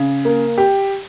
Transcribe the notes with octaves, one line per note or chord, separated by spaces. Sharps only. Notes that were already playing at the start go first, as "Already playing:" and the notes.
Already playing: C#3
A#3
G4